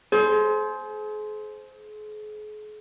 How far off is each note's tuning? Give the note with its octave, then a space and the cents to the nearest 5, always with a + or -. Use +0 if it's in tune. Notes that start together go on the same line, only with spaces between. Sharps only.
G#4 +40 C5 +0